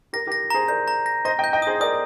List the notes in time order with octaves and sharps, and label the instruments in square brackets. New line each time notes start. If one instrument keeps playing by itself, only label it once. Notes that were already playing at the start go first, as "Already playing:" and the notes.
[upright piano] G4 A#4 [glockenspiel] A#6
[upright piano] G4 A#4
[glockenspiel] A#6
[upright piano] G#4 C5 [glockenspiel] A#5
[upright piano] A#4 D5 [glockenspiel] G6
[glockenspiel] A#5
A#6
[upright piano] C5 D#5 [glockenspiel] A#6
[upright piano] D#5 G5
[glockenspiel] G6
[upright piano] D#5 G5
[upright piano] G#4 C5 [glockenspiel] D#6
[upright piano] A#4 D5 [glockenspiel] D#6